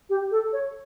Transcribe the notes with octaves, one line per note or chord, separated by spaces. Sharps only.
G4
A4
C#5